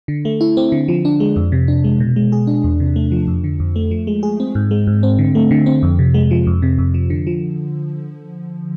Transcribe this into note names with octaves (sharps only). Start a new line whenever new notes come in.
D3
A3
E4
C4
D3
F3
D4
G#3
F2
C3
D4
G#3
B2
G#3
G#4
D4
E2
C3
A3
F3
F2
D3
F2
A3
F3
G#3
G#4
C4
G#2
G#3
G#2
C4
D3
A3
D3
C4
F2
C3
G#3
F3
F2
C3
F2
F3
D3
F3